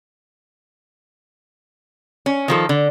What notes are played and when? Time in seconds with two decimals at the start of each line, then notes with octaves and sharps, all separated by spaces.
2.26 C#4
2.48 D#3 F3 A4
2.69 D3